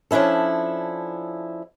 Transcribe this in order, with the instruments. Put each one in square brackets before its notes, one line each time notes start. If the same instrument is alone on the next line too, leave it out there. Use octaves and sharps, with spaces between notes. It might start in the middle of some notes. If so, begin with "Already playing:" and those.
[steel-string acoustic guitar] F3 C#4 D4 E4 A4